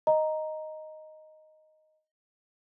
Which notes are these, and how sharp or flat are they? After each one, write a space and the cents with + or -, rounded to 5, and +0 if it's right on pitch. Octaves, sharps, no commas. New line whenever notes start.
D#5 +0 A#5 +0